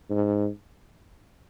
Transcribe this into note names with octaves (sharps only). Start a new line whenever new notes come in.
G#2